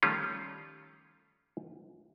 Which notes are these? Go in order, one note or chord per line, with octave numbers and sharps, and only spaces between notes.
D#3 F3 G3 A3 C#4 F4